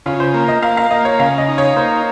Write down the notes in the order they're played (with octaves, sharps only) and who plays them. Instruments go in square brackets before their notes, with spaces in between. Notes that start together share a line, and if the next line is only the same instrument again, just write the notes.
[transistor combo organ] C#3 [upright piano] F4
[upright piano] C5
[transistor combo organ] A#3
[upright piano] D#5
[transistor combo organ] A#3 [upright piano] F5
[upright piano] F5
[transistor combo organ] A#3 [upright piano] D#5
[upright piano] C#5
[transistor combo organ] C#3 [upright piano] F5
[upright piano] D#5
[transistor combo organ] D#4
[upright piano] C#5
[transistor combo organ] A#3 [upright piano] C5